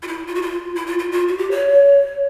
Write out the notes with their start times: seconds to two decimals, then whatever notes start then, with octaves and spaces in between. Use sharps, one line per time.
0.03 F4
0.08 E4
0.27 F4
0.35 F#4
0.42 F4
0.75 E4
0.86 F4
0.99 F4
1.12 F4
1.28 F#4
1.38 G4
1.51 C#5